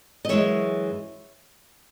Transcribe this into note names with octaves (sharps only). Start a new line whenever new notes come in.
D#5
F#2 E3 G#3 C#4 C#5 E5